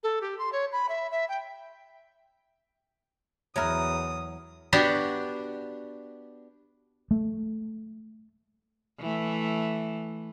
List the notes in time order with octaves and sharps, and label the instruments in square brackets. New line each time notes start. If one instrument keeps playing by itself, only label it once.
[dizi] A4
G4
C6
C#5
B5
E5
E5
G5
[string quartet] E2 D#6 [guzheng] F#3 E4 A#4
[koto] B3 D4 F#4 G4
[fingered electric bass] A3
[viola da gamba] E3 A3